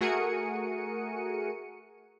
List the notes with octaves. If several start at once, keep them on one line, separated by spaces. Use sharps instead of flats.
A3 F#4 G#4 A#4 C#7 D#7